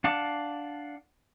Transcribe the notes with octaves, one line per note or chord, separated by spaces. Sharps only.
D4 F5 F#5 A5 D6